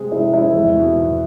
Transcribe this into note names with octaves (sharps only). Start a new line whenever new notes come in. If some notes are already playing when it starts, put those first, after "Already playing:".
Already playing: C3 G#3 C4 G#4
C3 E4
G#3 C4 E4 G#4
E2
B2 B3
E2